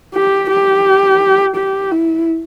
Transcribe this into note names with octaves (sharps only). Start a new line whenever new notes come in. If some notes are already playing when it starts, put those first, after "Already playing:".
G4
G4
G4
E4